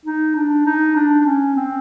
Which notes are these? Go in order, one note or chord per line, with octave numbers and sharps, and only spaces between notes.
D#4
D4
D#4
D4
D4
C#4
C4